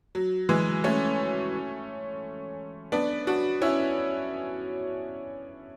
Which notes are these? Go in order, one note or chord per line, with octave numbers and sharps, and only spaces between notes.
F#3
E3 G#3
A3 C#4
B3 D4
D4 F#4
C#4 E4